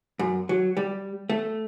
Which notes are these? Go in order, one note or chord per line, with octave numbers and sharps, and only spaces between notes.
F#2
F#3
G3
A3